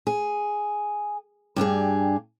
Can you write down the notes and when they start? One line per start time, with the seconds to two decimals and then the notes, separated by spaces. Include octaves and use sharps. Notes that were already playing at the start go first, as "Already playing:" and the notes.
0.07 G#4
1.56 G2 D4 G4 G#4